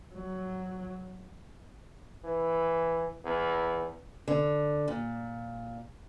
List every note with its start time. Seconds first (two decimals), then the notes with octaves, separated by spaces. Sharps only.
0.14 F#3
2.25 E3
3.25 E2
4.28 D3
4.88 A#2